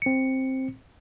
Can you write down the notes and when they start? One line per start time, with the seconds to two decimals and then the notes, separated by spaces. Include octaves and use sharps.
0.02 C4 C#7